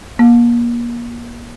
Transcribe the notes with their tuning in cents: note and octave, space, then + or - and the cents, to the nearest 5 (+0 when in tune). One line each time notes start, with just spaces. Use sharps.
A#3 +30